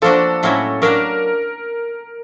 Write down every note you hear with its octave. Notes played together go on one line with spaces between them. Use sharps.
F3 A#3 D4 F#4 A4
A2 F#3 A#3 C#4 E4
F#3 A#3 D4 A#4